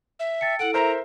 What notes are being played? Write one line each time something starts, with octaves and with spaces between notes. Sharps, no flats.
E5
G5 A5 E6 A6 C#7
E4 A4 F#5 D7
A#4 C5 E5 A#5